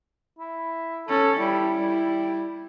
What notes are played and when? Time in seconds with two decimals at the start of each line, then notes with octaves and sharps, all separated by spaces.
0.39 E4
1.09 C#4 A4
1.39 G3 E4
1.79 G3